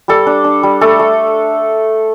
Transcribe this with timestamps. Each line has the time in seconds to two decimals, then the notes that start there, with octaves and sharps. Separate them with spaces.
0.08 G3 A4
0.27 D4
0.44 D4
0.63 G3
0.81 A3 A4
0.99 A3